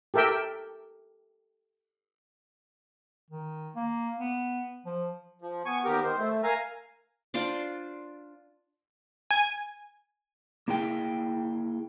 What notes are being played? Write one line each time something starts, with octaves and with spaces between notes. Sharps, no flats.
G4 A4 A#4 E5 G5
D#3
A#3
B3
F3
F3
B3 G#5 C#6
D#2 G4 A#4
D#3 C5
A3
A#4 F5 G#5 A#5
D4 F4 C5 D5
G#5
A#3 E4 G#4 G5